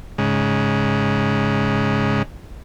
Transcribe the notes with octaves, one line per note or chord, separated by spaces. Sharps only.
G#2 C#3 G#3